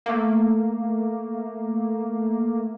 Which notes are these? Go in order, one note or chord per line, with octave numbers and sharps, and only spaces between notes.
A3 A#3